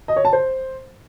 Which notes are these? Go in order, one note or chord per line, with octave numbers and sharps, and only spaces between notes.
D#5
C#5
A5
C5